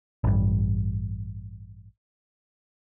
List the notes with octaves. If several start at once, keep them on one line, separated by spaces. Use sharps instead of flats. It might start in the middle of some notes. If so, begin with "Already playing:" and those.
A1 G2